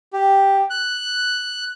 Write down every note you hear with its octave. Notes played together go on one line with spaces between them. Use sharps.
G4
F#6